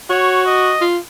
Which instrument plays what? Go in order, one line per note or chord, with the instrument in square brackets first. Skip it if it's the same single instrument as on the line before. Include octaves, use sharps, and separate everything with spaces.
[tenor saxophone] F#4 [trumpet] C#5
[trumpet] D#5
[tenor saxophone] F4